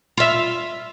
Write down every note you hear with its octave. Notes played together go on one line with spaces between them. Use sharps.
F4 E5